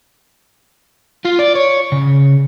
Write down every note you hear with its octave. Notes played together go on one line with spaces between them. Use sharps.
F4
D5
C#5
C#3